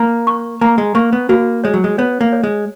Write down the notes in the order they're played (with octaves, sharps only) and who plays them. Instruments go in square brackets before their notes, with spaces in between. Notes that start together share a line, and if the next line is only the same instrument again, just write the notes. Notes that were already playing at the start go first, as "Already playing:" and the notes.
Already playing: [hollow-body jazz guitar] A#3 [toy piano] A#5
[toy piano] C#6
[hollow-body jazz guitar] A#3 [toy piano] A#5
[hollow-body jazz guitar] G#3
[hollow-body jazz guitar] A#3 [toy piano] C#6
[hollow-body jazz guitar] B3
[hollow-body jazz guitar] A#3 [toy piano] F#4
[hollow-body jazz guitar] G#3 [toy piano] C#5
[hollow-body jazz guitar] F#3
G#3
[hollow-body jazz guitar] B3 [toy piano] C#5
[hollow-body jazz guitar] A#3
[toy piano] C#5
[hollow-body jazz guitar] G#3